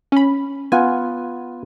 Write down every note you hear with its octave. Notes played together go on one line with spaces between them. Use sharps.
C#4 B5
B3 F4 F#5 G#5